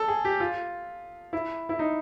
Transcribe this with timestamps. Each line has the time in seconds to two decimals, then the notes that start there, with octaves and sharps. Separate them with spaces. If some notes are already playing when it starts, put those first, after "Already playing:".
Already playing: A4
0.08 G#4
0.25 G4
0.40 F4
1.33 E4
1.69 E4
1.79 D#4